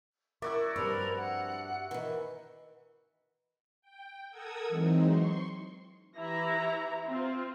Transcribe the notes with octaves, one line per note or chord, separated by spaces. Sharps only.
E4 F#4 A#4 D5 E5 C#6
G2 F3 G3 C4 A#4 B5
F#5
D#3 E3
G5
A4 A#4 F#5 D#6 E6 G#6
E3 F#3 G#3 C4 D#4
C6 C#6
E3 E4 G4 A#5
C4 F4